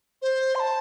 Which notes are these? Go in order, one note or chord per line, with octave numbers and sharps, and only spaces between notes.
C5
C6
A5